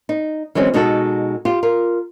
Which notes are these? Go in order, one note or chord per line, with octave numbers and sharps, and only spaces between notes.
D#4
E3 F#3 G#3 C4 C#4
B2 G#3 D#4 F#4 A4
F4 G4
F4 A#4